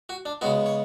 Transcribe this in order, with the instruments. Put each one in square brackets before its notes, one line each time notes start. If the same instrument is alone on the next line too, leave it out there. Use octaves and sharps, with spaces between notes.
[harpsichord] F#4
D4
C#3 G#3 B3 F#4
C#5